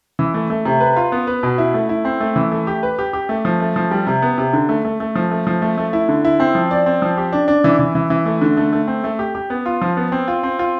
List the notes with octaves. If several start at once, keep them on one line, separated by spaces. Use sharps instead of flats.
E3
A3
A3
C3
B4
F4
B3
B4
B2
E4
A3
E4
C4
A3
E3
A3
G4
B4
G4
G4
A3
F3
A3
F3
G3
C3
B3
C3
D3
A3
A3
A3
F3
A3
F3
A3
A3
E4
D3
E4
C4
F3
D5
C4
F3
G4
D4
D4
E3
E3
E3
E3
A3
D3
A3
A3
C4
A3
G4
G4
B3
F4
F3
B3
C4
F4
C4
F4